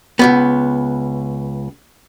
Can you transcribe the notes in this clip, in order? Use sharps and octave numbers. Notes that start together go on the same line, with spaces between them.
C#2 F#2 B3